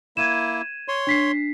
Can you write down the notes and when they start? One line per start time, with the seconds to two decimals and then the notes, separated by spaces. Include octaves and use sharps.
0.17 A#3 E4 G#6 D#7 E7
0.88 C#5 C6
1.07 D4 B6 C7